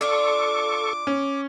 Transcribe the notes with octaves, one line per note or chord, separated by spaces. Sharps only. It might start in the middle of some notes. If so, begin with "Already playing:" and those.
D4 F4 A4 C#6 D6
C#4